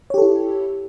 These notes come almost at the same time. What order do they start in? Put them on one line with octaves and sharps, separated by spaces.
C#5 G4 A4 E4